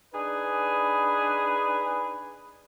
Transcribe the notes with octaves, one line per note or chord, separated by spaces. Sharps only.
D4 D#4 G#4 B4